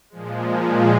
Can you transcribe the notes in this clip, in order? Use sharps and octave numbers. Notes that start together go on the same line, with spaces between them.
A#2 F3 G#3